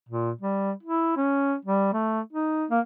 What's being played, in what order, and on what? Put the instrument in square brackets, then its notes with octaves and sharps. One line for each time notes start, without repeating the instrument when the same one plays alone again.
[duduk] A#2
G3
E4
C#4
G3
A3
D#4
A#3